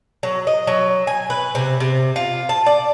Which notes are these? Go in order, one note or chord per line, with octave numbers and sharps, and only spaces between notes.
F#3
D#5
F#3
G#5
B4
C3
C3
F4
A5
D5